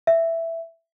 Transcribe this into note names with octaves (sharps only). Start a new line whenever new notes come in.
E5